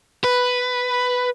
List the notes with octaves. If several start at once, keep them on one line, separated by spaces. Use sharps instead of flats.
B4